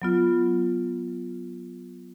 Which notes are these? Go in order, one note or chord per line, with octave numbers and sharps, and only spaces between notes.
F#3 B3 F4